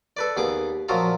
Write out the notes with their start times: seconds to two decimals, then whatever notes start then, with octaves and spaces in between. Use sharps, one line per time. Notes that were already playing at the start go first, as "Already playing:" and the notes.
0.17 A4 B4 D5
0.37 D#2 B3 G#4 D6
0.89 A#2 F3 F#3 F4 A#5